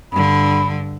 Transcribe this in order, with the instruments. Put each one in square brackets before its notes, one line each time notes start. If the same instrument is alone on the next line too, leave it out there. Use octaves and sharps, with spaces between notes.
[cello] G2 D3 [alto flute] B5